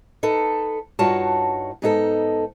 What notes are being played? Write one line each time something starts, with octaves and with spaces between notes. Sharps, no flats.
D#4 A4 B4
G2 D#4 F4 F#4 C#5 A5
G#2 B3 D#4 F4 A4